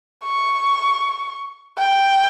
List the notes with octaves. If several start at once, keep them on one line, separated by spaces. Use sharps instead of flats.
C#6
G5